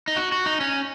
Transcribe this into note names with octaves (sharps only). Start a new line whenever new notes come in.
D#4
F#4
F#4
D#4
C#4